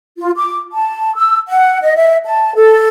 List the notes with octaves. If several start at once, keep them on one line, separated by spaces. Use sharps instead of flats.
F4
D6
A5
E6
F#5
D#5
E5
A5
A4